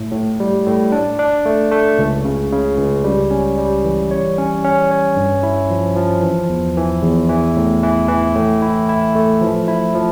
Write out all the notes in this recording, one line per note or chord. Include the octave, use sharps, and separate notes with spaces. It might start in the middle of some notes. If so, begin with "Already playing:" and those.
Already playing: A2
A2
G3
A2
D4
D4
A3
A3
C#2
C#3
C#3
C#2
G3
C#4
G3
E3
C#5
C#4
C#4
C#5
G2
E4
F3
F3
E3
E2
E3
E2
E3
A2
E3
E3
A2
E4
E4
A3
F3
E4
F3